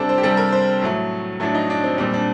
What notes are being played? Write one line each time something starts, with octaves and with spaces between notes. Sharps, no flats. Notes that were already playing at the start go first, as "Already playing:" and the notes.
Already playing: C3 G3 C4 D4 A4
C5
G4
C3 G3 A4
A#4
C5
A2 F#3 A3
A2 F#3 A3 D4
D#4
D4
C4
A#2 G3 C4
D4